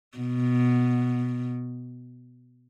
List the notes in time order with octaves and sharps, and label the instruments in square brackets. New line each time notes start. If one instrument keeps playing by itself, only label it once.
[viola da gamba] B2